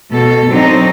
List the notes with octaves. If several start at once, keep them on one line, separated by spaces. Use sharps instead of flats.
B2 A4
F#3 C4 D4 D#4